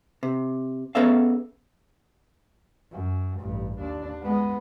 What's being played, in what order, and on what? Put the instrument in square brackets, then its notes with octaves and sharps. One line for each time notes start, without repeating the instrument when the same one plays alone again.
[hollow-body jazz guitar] C3
B3 C#4 G#4 A4 E5 F5
[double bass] F#2
A1 G2
D#2 D4
G#3 B3